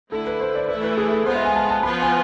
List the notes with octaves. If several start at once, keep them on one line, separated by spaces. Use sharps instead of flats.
D3 A3 E4 A4
B4
C5
D5
E3 A3 E4 B4
B4
G#4
A4
G#3 B3 F4 C5
E5
G#5
A5
A5
F3 B3 F4 B4 B5
G#5